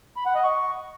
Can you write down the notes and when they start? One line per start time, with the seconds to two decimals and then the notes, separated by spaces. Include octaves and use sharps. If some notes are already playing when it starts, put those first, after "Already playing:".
0.17 B5
0.26 F#5
0.35 D#5
0.44 C#6